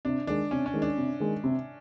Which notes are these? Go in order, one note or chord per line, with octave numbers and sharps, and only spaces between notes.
C3 D4
D#3 G#3 D4
C3 C#4
C#4
D#3 G#3
D4
C3
D#3 G#3
C3